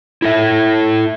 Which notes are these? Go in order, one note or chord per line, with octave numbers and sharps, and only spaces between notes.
E4 A4 E5